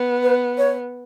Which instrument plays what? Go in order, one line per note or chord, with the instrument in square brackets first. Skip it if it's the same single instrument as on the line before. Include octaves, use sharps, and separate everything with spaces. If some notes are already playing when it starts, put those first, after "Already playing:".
Already playing: [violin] B3
[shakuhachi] B4
C#5